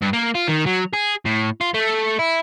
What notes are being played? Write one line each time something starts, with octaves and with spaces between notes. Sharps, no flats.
G2
A#3
F4
D#3
F#3
G#4
A2
F4
A3
E4